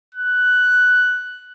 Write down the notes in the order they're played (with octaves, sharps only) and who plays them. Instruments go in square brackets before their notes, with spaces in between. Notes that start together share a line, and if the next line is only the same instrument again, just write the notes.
[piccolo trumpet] F#6